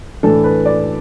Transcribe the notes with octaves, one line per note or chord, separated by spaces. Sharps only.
A2 E3 A3 D4 A4
B4
D5